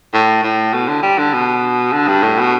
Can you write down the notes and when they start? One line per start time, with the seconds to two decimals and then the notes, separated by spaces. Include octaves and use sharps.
0.14 A2
0.43 A2
0.73 B2
0.89 D3
1.03 G3
1.19 D3
1.34 B2
1.93 D3
2.08 G2
2.23 A2
2.39 B2